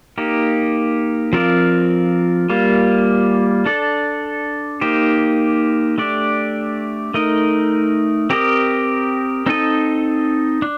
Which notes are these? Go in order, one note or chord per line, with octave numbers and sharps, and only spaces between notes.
A#3 D#4 G4
F3 C4 F4 A#4 D5
G3 A#3 F4
D4 A4 D5
A#3 D#4 G4 C5
A3 D4 G4 D5
A3 D#4 A#4 D#5
C4 G4 A#4 D#5
C4 D#4 A4 D#5
D4